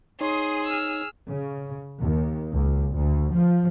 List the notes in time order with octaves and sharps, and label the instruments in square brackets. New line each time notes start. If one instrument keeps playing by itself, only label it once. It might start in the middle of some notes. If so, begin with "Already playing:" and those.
[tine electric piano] D#4 C#5 [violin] G#4 [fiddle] C6 D#6
[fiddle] E6 F6
[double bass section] C#3
D#2
C#2
D2
F3